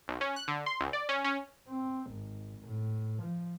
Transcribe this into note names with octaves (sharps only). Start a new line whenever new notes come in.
B1
C#4
F#6
D3
C6
C#2
D5
C#4
C#4
C4
G#1
A2
F3